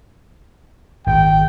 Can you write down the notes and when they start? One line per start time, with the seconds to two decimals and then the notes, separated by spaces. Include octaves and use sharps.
1.07 G#1 G5